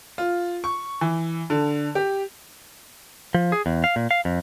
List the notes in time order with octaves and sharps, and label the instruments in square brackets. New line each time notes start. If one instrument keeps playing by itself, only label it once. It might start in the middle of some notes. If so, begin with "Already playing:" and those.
[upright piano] F4
C#6
E3
D3
G4
[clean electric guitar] F3
G#4
E2
F5
A#2
F5
F2